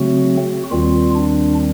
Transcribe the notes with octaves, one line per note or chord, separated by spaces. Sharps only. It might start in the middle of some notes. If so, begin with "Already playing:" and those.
Already playing: C#3 F#3 A3 C4 F#4
D#2 D#3 G3 C4 F4
D4